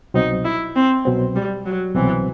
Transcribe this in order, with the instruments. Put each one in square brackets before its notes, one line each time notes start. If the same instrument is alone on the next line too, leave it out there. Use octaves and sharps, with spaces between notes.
[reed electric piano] C2 B2 F#3 C4 [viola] D#4
[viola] E4
C4
[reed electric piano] C2 B2 F#3 C4
[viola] G3
F#3
[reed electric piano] C2 B2 F#3 C4 [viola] E3